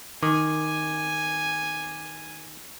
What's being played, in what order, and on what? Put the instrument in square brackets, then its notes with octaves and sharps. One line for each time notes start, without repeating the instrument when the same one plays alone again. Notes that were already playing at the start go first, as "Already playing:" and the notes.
[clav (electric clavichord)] D#3 [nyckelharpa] G#5 [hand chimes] D6